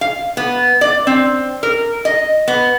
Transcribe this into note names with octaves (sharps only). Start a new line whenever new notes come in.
F5
B3
D5
C4
A#4
D#5
B3